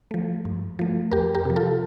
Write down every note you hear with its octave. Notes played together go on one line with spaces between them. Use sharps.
F3 A3
G2
F3 A3
F2 G4 A#4
G4 A#4
C3 F3
F4 A4